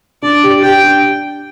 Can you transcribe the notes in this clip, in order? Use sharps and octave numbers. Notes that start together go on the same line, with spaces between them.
D4 D5
G4
G4 G5
D4